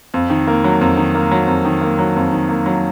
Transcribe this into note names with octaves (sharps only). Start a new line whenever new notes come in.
F2
D#3
A#3
F#3
F2
D#3
A#3
F#3
F2
D#3
A#3
F#3
F2
D#3
A#3
F#3